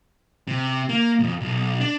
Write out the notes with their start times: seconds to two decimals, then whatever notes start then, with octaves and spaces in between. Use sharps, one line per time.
0.48 C3
0.89 A#3
1.19 B1 F2
1.41 B1
1.80 D4